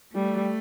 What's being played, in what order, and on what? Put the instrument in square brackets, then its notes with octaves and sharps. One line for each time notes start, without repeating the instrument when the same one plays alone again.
[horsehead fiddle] G3 [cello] A3